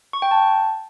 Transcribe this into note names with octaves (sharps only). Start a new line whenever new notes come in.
C#6
G5
A5